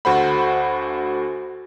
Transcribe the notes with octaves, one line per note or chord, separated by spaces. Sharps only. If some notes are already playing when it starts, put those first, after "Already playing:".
D2 F#4 A4 C5 F#5 B5